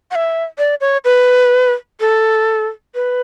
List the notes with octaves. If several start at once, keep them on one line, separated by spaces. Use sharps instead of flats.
F#5
E5
D5
C#5
B4
A4
B4